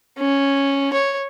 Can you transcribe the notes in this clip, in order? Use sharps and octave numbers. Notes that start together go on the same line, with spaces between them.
C#4
C#5